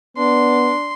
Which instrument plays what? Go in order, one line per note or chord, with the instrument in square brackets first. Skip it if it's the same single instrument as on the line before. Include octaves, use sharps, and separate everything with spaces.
[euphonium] B3 [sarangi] D4 [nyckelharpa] C6